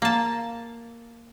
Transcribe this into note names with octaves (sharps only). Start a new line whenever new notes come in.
A#3 A5